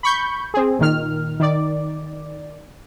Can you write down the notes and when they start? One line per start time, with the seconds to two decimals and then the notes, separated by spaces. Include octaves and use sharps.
0.03 B5 C#6 G6
0.54 C4 G#4
0.79 A#2 D#3 F6
1.40 D#3 D5